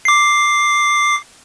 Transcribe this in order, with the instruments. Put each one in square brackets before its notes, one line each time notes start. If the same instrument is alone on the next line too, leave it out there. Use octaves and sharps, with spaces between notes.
[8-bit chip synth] D6 C7